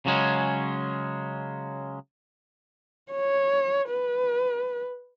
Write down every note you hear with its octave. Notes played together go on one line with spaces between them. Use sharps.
C#3 F#3 G#3 C#4
C#5
B4